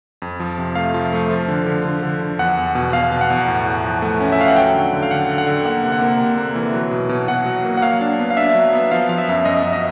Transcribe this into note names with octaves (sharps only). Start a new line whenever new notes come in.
F2
F3
C3
A3 F5
F3
A3
F3
D3
D3
D3
D3
D3
E2 F#5
E2
B2
B2 F5
B2
F#5
E2
A2
A2
F3
A3
C#4
E5
A3 F5
F#5
F#3 G5
D3
D3
F5
D3 F#5
D3
F#5
D3
A#3 F#5
C3
F#5
A#3
C3
A#3
E3
F#3
B2
B2
B2 F#5
F#3
A#3
F#5
F#3 F5
D4
B3
F5
D4 E5
F#3
B3
F3 F5
F3 F5
E5
F#2
F#2 D#5
F#2
D#5